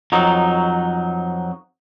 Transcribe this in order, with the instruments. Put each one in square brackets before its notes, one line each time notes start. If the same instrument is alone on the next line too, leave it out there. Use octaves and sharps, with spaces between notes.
[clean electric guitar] F2 F#3 D#4